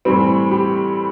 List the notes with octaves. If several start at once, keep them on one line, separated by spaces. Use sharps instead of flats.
A2 E3 G3 C4
G4